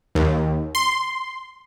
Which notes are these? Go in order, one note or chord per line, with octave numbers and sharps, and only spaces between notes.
D#2
C6